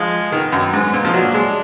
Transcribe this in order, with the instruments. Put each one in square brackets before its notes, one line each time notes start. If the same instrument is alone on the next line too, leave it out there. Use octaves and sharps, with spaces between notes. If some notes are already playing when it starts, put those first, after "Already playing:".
Already playing: [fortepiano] F3 [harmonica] G#3
[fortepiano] D#3 [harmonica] B3
[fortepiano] F#2
G#2
A#2
[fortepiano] F3 [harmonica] D#4
[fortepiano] F#3 [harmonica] D4
[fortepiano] G#3